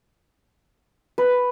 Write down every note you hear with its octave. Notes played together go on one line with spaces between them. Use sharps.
B4